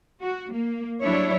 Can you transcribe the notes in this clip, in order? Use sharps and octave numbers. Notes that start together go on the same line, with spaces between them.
F#4
A#3
F#3 G3 D4 E4 C#5